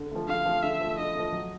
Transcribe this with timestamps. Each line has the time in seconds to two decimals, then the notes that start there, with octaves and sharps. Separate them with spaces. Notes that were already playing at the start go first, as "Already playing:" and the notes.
Already playing: D3
0.11 F3 A3
0.28 D3 F5
0.46 F3 A3
0.63 D3 E5
0.81 F3 A3
0.98 D3 D#5
1.15 F3 A3
1.32 F#3